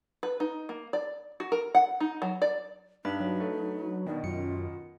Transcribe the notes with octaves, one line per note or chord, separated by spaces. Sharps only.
B4
D#4
A#3
D5
F#4
A#4
F#5
D#4
F#3
D5
G2 D4 D#4 B4 B5
F#3
A3
B2 D#3 D5
F#2 F4 C#7